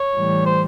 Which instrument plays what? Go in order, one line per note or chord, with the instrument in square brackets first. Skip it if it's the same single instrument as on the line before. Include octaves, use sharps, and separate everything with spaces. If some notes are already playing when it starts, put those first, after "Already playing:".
Already playing: [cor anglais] C#5
[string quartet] A2 E3 G3
[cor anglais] C5